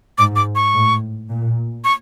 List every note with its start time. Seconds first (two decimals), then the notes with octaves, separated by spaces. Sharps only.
0.18 G#2 D6
0.36 D6
0.55 C#6
0.73 A2
1.29 A#2
1.84 C#6